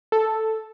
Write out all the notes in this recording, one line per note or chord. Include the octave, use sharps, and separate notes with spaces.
A4